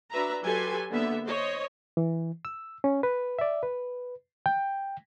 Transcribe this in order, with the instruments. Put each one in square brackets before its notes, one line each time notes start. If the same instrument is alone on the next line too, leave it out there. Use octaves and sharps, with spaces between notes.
[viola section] D4 F#4 B4 E5 A#5
F#3 G4 A4 B4 G#5 C6
D3 A#3 B3 E5
C5 C#5 D#5
[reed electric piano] E3
E6
C#4
B4
D5 E5
B4
G5